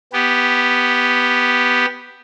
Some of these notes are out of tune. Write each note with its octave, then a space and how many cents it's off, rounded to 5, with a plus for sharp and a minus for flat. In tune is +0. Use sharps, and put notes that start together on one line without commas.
B3 +0 G4 +0